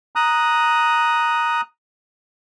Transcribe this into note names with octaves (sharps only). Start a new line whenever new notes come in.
A#5 D#6 F#6